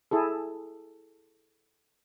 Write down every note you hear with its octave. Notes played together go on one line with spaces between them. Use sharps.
E4 G#4 A4